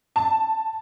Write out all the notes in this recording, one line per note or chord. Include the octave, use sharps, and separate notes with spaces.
A5